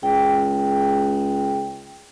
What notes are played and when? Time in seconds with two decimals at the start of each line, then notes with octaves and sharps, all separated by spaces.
0.03 C#2 G#4 G5